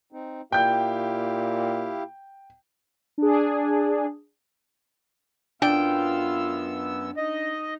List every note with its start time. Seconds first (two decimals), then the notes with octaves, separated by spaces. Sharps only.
0.12 C4 D#4
0.52 A#2 E4 G4 F5 G5 G6
3.18 D4 G#4
5.62 F#2 B3 D4 F4 G5 E6
7.17 D#4 D#5